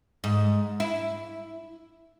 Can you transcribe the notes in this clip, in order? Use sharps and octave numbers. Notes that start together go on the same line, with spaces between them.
G#2
E4